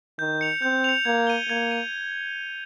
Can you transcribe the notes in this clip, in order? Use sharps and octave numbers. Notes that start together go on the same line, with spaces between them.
D#3 G6
C#7 F7
C4 G6
C#7 F7
A#3 G#6
D#7 G7
A#3 G#6
D#7